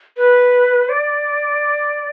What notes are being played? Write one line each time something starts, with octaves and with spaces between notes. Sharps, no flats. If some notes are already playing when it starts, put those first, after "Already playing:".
B4
D5